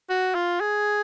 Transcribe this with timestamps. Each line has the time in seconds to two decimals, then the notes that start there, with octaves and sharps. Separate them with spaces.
0.10 F#4
0.35 F4
0.61 G#4